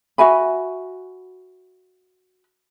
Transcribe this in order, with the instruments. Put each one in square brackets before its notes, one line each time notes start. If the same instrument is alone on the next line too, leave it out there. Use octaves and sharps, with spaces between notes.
[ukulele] F#4 E5 G#5 B5